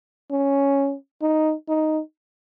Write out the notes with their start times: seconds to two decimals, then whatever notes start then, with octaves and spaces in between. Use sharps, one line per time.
0.31 C#4
1.22 D#4
1.69 D#4